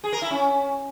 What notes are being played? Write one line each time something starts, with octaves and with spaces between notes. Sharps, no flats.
G#4
A#4
E4
C#4